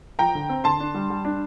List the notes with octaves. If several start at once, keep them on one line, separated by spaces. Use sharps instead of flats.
F3 G5 A#5
D3
C4
D3 A5 C6
D4
G3
G3
D4